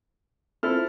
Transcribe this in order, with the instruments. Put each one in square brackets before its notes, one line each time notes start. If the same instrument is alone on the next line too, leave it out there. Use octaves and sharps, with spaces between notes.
[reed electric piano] C4 F4 C5 [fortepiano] E4 A4 F6